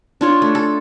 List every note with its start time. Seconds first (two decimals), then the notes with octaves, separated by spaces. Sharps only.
0.21 D4 F4 C#5
0.42 A3
0.55 A4